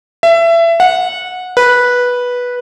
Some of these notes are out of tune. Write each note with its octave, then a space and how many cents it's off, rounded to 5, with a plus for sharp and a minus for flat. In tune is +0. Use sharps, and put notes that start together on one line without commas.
E5 +25
F#5 -20
B4 -10